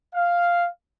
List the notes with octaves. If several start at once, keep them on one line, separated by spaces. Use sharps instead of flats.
F5